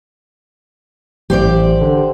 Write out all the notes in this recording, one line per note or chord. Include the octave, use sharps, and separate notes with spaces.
A1 G4 C5 D5
D3